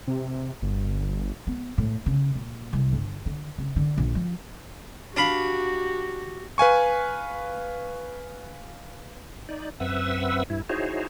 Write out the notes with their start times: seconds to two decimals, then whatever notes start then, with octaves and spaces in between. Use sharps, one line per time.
0.08 C3
0.62 G1
1.47 B3
1.78 A2
2.06 C#3
2.35 A#2
2.73 C2
2.93 G1
3.26 D3
3.58 C#3
3.76 D3
3.97 A#1
4.15 F3
5.16 D4 F#4 G4 F5 B5
6.58 B4 F5 G#5 C#6
9.49 D#4 D5
9.80 F#2 C4 B4 E5 F#5 E6
10.50 G2 E4
10.70 D#4 E4 F#4 G#4 C5 C#5